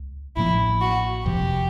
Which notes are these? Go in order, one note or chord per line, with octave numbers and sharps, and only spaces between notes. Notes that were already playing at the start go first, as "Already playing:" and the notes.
Already playing: C#2
A1 A2 F3 A#3 E4
F#4
F#1 F2 C3 F3 G4